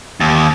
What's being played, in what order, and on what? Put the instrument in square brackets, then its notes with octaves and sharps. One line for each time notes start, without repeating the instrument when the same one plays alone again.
[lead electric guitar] D#2